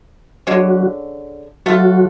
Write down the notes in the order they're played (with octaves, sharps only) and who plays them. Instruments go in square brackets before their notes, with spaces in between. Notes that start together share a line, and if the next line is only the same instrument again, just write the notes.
[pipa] D3 G#3 C#4 [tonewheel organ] F#3 F#4
[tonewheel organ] F#3 F#4 [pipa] A3 F4 A4